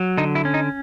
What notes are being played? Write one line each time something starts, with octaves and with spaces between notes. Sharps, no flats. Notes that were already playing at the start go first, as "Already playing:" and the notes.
Already playing: F#3
D3 D#4
E4
C#4
D#4